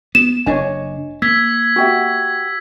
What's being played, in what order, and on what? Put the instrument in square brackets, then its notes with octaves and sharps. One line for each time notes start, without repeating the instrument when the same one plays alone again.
[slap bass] B3 [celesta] E7
[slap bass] F#1 D4 [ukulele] C#5 D#5 G#5
[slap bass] A#3 [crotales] E6 G#6 B6
[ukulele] F#4 G4 E5